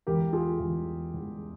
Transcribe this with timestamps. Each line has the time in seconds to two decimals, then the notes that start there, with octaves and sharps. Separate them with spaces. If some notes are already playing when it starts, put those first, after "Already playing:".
0.07 E2 E3 G#3 G4 A#4
0.33 F4 G#4
0.60 E2 E3 G#3
1.14 E2 E3 G#3